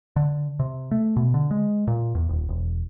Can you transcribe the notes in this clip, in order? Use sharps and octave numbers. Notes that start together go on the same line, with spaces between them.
D3
C3
A3
B2
D3
G#3
A#2
E2
D#1
E1